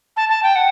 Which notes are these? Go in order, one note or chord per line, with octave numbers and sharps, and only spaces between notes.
A5
A5
G5
F#5